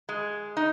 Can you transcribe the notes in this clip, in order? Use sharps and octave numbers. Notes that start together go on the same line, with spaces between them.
G#3
D#4